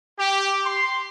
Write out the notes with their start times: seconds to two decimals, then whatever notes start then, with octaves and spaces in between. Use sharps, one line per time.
0.19 G4
0.66 C6